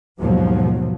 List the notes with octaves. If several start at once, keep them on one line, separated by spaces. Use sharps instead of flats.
D#2 G#2 B2 F3 F#3